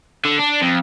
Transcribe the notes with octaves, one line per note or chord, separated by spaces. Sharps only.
D3
D4
F2